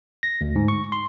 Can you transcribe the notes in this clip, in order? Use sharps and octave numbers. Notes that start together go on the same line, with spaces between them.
A#6
D2
G#2
C#6
C6